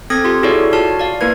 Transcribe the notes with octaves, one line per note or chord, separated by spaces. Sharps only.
C4 A4 D#6 G#6 A#6
F4 G4 C6
E4 F#4 G#4 A4 C#5 D5
F4 F#4 C#5 A5 F6
D5 F5
A#3 E4 A#4 B4 G#6